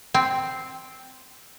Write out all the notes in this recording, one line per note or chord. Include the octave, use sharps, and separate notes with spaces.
C4